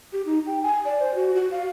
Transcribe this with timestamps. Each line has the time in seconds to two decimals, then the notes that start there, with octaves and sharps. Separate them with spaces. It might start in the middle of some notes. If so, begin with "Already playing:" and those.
0.13 G4
0.26 D#4
0.46 G5
0.63 G#5
0.85 D5
1.00 C5
1.15 F#4
1.35 F#4
1.51 F5